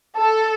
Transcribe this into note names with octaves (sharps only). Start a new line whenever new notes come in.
A4